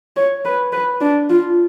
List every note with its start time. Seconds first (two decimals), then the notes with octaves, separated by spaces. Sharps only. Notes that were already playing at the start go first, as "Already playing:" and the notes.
0.16 C#5
0.45 B4
0.73 B4
1.01 D4
1.30 F4